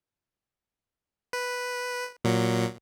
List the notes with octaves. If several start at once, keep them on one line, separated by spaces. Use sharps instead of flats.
B4
A#2 F#3